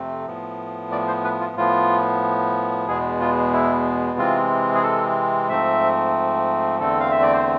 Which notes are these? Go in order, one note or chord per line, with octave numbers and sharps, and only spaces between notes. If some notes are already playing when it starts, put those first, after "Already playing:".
Already playing: F2 C3 A3 C4
A2 F3 B3
D5
C5
B4
F4
A2 F3 B3 F4
E2 B2 G#3 B3 G#4
F4
E4
C3 E3 G#3 C4 F4
G#4
A4
G#2 F3 A3 C4 E5
E2 D3 A3 C4 A4
F5
E5
D5
C5